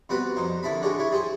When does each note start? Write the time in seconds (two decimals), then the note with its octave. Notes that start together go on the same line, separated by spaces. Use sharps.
0.09 C3 G3 B3 F#4 B4
0.36 F2 D#4 C5
0.63 D3 D#3 E4 A4 B5
0.82 D3 G#3 C#4 F#4 G4
0.99 E4 C#5
1.11 G3 G#4 C5 G5 C#6